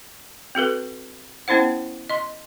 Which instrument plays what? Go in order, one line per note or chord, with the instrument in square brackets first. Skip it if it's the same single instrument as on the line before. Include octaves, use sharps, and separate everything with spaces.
[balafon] C4 F#4 A4 B4
B3 C#4 E4 C5 F#5
D#5 C6